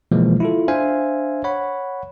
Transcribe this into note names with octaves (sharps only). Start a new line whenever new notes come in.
B2 D3 E3 F3 G#3 A#3
E4 F4 A4
D4 C5 E5 F5 G#5
C#5 F#5 B5